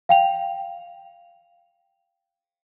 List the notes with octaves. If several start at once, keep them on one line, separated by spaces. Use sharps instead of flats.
F5 G5 F7